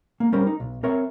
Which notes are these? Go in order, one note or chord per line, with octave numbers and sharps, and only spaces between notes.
A#3
G3 C#4 A#4 C5
D#4
B1
C4 A#4 C#5 E5